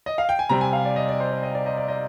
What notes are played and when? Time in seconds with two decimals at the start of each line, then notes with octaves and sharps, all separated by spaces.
0.06 D#5
0.18 F5
0.29 G5
0.39 G#5
0.49 C3 G3 C4 A#5
0.61 G#5
0.73 F5
0.85 D5
0.96 D#5
1.08 D5
1.20 C5
1.31 D5
1.43 D#5
1.55 D5
1.66 D#5
1.77 D5
1.88 D#5